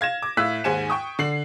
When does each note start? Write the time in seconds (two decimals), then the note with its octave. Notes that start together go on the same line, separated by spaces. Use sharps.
0.01 F5 G#6 A#6 E7
0.22 D6
0.37 A2 F5 E6 F#6 B6
0.64 D#2 G#2 C5 G#5 C#7 E7
0.90 G5 C#6 D#6
1.19 D3 C7 F#7